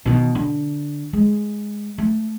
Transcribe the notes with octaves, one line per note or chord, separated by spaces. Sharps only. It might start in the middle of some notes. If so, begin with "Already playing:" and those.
B2 D#3
D3
G#3
A3